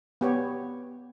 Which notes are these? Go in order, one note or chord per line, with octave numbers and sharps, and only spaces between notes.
B3 G4 C#5